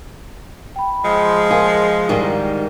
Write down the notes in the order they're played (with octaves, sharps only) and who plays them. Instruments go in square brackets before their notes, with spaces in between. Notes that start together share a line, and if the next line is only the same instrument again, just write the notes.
[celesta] G5 B5
[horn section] F3 G#3
[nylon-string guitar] G#4 [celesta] A#4 F5
[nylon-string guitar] G#2 D#3 G3